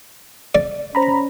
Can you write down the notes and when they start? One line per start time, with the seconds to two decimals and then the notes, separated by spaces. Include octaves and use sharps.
0.55 D5
0.95 C#4 C5 A#5 B5